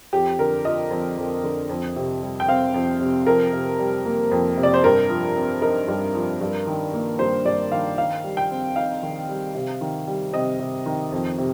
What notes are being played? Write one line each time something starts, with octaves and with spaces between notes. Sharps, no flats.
F2 G4
D3 A#4
F3 D#5
F2
F2
D3
F2
C3
G3
G5
C4 F5
F2
C3
F2 A#4
C3
G3
A#3
F2
C3
D5
C5
G2 A#4
F3
C4
D#4 A#4
G2
F3
G2
D#3
A#3
G2 C5
G2 D5
D#3 F5
D#3 F5
G3
G5
C4
D#4 F5
D#3
G3
C3
D#3
G3
C3 D#5
C3
D#3
F2
C3